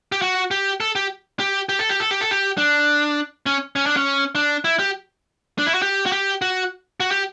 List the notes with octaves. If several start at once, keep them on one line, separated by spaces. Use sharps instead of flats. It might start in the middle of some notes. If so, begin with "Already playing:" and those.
G4
F#4
G4
A4
G4
G4
G4
A4
G4
A4
G4
A4
G4
D4
C#4
C#4
D4
C#4
D4
E4
G4
D4
E4
F#4
G4
F#4
G4
F#4
F#4
G4